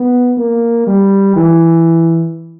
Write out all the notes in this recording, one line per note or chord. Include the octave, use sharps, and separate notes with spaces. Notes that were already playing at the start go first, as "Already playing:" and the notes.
Already playing: B3
A#3
G3
E3